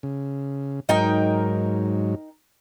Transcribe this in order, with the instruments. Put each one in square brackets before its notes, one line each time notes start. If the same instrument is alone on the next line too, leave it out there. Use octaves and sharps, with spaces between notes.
[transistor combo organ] C#3
[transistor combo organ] G#2 F#3 [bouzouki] D#4 A#4 G5